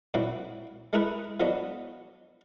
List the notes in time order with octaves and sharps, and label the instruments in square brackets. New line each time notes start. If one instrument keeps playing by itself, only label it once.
[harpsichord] A#2 F#3 C4 E4
G#3 A3 E4 G#4 A#4 B4
F3 F#3 B3 D4 F#4 D#5